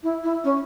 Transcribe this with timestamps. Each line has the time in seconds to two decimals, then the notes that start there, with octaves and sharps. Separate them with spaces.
0.03 E4
0.23 E4
0.44 C#4